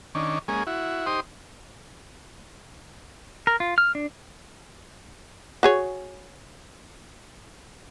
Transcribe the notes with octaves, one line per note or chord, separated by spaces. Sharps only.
D#3 C#4 D4
G#3 A#3 C#4 G#4
E4 F#4
D#4 G4 C5 C6 D#6
A#4
F4
F6
D4
F#4 G#4 C#5